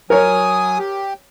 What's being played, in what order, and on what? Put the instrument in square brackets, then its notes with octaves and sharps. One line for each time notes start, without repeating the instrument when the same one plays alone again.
[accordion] F#3 G#5 D#6 [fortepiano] A#4 C#5
[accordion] G4